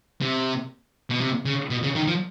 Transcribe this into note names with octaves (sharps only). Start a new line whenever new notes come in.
C3
B2
C3
C#3
B2
C#3
D#3
F3